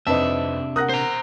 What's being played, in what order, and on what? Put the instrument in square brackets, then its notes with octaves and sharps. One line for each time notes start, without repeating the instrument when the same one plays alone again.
[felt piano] F2 [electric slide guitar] C3 D4 [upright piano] D#4 B4 A5 [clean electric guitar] E5
[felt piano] A#4 F#5 [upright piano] D#6 F#6 A#6
[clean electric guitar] C5 A#5